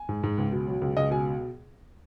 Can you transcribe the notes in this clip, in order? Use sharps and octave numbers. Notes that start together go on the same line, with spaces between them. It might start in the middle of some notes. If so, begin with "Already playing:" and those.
Already playing: G#5
G#2
G#2
C#2
B2
F#3
C#2
C#2 D#5
B2 G#5